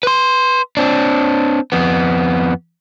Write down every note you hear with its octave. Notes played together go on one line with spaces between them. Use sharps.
B4 C6
C4 D4
F2 B3